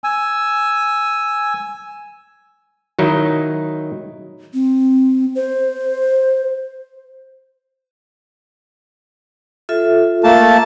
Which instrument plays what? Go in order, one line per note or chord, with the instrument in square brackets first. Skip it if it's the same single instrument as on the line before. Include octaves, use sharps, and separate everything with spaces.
[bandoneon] G#5 E6
[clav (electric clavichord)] D#3 F#3 D#4 E4
[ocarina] C4
C5
[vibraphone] F4 A4 E5
[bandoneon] A3 A#3 A5